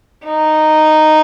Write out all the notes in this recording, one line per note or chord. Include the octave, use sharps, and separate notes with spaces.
D#4